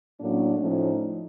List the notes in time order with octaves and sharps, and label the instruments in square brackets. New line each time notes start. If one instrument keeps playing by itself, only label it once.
[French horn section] A2 F#3 A#3 C#4 D4
A2 F3 A3 C#4 D#4